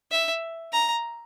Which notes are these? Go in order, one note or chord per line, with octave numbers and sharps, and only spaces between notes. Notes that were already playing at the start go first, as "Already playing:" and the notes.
E5
A#5